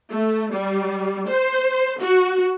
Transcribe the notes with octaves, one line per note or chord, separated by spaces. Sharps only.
A3
G3
C5
F#4